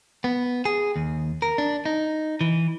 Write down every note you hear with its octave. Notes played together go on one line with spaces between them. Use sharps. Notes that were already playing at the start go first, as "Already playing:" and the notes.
B3
G#4
D#2
A#4
D4
D#4
E3